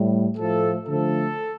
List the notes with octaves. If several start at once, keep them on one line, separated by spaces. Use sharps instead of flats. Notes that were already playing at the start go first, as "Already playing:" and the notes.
Already playing: A2 G3
A2 F3 A3 A4
D3 F3 A3 A4